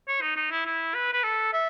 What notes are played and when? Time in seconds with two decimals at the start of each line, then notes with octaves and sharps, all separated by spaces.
0.08 C#5
0.21 D#4
0.36 D#4
0.51 E4
0.66 E4
0.95 B4
1.13 B4
1.23 A4
1.53 E5